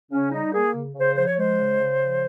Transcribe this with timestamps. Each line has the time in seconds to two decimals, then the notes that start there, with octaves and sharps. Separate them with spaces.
0.11 C#3 C#4
0.32 G3 D#4
0.53 A#3 G#4
0.74 C#3
0.95 C#3 C5
1.16 F3 C5
1.26 C#5
1.37 G#3 C5
1.58 C#3
1.80 C#3
2.01 F3